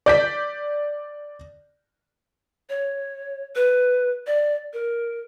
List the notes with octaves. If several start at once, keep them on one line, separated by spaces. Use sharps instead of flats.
D5 G6 B6
C#5
B4
D5
A#4